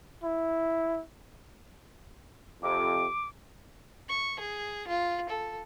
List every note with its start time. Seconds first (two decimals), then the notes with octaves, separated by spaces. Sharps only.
0.24 E4
2.62 F2 C3 D6
4.09 C#6
4.40 G#4
4.88 F4
5.29 A4